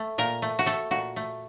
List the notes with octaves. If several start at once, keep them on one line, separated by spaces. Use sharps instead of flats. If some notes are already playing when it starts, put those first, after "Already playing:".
Already playing: A3
A#2 A#4
A3
F#4
A3 A4
A#2 F#4
A3